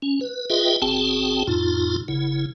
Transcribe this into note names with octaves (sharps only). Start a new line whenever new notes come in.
C#4
B4
F4 G#4 B4 D#5 E5 G5
F#1 C4 F#4 G#4 G5 A5
F2 A2 D#4 F4
F#1 C#3 E4